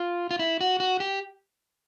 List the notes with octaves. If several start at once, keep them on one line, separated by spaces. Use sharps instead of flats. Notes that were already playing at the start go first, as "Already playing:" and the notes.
Already playing: F4
F4
E4
F#4
F#4
G4